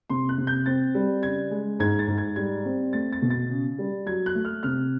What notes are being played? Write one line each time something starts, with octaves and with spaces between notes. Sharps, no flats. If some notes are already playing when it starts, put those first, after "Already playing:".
C3 C6
F#6
C3
G6
C4 A6
G3
C#3 G#6
G#3
G#2 G#6
A6
G#2
G#6
G3 G#6
C4
A3 A6
A6
B2
A6
C#3
G3
F#3 G#6
F#6
A3
F6
C3 F6